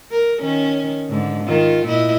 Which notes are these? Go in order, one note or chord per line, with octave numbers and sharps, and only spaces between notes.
A#4
D#3 C#4
G#2 D3
D#3 F4
A#2 E4 D#5